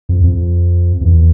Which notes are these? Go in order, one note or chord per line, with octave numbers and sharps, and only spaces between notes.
F2
F2
E2